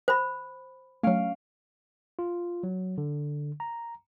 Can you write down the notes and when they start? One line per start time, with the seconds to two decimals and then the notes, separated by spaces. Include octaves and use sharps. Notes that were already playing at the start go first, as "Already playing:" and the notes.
0.08 C5 B5
1.03 F#3 A3 C#4 F5 D7
2.19 F4
2.63 F#3
2.98 D3
3.60 A#5